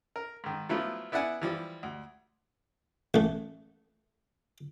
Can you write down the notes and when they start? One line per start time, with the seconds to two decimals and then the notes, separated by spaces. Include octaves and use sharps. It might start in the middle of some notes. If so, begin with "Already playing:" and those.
0.16 A#4
0.44 G#2 D#3
0.69 F3 F#3 A3 B3 E4 F4
1.12 B3 E4 D5 E5 F#5 G#5
1.42 E3 F3 G3
1.83 D2
3.14 A1 A3